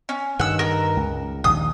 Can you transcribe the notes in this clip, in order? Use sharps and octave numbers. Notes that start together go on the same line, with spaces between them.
C#4
G2 D#3 F#5 E6
A#4
C#2
A#1 D#2 D#6